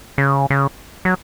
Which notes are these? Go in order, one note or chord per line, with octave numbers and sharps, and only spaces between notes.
C#3
C#3
F#3